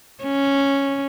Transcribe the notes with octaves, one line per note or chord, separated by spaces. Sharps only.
C#4